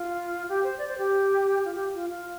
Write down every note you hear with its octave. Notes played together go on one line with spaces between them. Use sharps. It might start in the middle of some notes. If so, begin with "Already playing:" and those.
Already playing: F4
G4
C5
D5
C5
G4
F4
G4
F4
F4